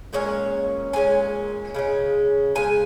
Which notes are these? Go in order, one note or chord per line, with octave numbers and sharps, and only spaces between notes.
A#2 G#3 C#4 C#5
A#2 G#3 C#4 G#5
C#3 G#3 C#4
C#3 G#3 G#5